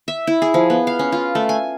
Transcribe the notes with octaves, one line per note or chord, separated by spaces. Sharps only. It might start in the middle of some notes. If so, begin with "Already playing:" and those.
E5
E4
G#4
F3
B3
F5
C#4
F4
A3
G#5